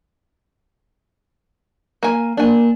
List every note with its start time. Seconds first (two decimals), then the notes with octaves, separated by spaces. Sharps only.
2.03 A#3 G#5
2.37 A#3 D4 G#5